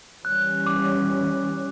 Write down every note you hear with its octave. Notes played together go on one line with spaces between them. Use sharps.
E3 G3 C#4 F#6
D6